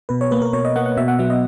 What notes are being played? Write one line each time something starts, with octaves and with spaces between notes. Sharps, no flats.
B2 B4
C#5
A#3 B4
A#4
B2 C#5
D#5
A#3 F#5
F#5
B2 E5
F#5
F#3 B3 E5
D#5